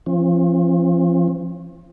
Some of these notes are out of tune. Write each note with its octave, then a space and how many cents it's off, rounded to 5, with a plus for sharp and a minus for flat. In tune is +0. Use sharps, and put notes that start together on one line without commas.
F3 -25 C4 +45